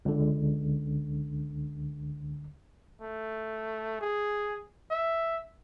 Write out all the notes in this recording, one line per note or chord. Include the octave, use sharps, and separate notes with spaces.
C#2 D3
A3
G#4
E5